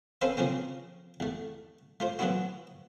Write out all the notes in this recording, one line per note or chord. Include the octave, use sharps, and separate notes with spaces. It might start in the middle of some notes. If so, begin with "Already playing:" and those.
C4 C#4 A4 B4 C5 F5
C#3 F3 A#3 C4 C#4
E2 A3
A3 F4 C5
E3 F#3 A#3 B3 E4 F#4